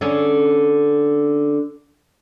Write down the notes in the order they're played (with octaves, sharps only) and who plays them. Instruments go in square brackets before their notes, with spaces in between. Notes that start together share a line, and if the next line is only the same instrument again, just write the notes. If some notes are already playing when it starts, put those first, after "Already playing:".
[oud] D3 C#4 G#4